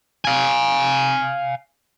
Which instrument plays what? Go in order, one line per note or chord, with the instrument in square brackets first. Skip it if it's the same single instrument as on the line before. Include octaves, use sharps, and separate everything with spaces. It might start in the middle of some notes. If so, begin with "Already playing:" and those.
[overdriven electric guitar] F5 G#5